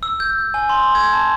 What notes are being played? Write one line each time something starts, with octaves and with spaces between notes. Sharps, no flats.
E6
G6
G#5
C6
G#6
A5